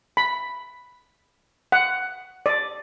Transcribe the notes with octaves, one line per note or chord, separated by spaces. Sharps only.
B5
F#5
D5